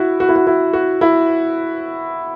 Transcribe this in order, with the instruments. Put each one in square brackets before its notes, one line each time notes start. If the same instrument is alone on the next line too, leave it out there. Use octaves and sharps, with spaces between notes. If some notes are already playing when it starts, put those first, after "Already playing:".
Already playing: [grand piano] E4 F#4
F#4
E4
F#4
E4
F#4
E4